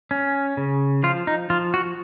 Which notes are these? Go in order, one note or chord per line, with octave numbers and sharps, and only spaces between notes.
C#4
C#3
F3 F4
D#4
F3 F4
F#4